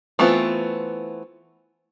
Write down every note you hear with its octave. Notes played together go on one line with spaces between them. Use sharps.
E3 A3 B3 C4 F4